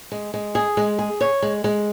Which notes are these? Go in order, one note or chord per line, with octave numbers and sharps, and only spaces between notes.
G#3
G#3
G#4
G#3
G#4
C#5
G#3
G#3